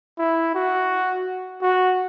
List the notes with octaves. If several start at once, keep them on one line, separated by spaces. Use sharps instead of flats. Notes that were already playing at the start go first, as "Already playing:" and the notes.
E4
F#4
F#4